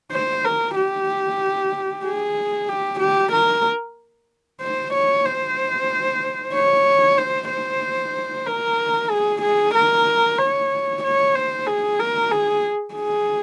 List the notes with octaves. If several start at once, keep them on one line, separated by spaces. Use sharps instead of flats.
C5
A#4
G4
G#4
G4
G4
A#4
C5
C#5
C5
C#5
C5
C5
A#4
G#4
G#4
A#4
C#5
C#5
C5
G#4
A#4
G#4
G#4